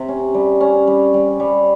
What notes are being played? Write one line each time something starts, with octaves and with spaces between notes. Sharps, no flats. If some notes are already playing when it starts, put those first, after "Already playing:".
Already playing: C3
C#4
G3
C#4
G3
G3
G3